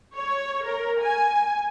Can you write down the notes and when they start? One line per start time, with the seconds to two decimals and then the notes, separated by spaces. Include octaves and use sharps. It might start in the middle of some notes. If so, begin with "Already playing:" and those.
0.14 C#5
0.66 A#4
1.00 G#5